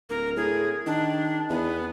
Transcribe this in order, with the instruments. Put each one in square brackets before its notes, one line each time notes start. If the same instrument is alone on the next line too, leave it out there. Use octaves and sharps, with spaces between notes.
[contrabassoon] D1 [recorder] A#4
[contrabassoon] A2 [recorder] G#4
[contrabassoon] D#3 [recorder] D4
[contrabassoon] E2 [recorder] B3